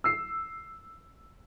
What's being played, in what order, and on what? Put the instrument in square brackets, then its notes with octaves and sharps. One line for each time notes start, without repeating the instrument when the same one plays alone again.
[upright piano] E6 C7